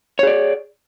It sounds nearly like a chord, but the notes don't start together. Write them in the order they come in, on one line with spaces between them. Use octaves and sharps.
C#5 G#4 D5